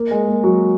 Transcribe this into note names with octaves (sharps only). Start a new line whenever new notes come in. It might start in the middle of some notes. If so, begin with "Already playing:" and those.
Already playing: A#3
G#3
A#3
F#3 F#4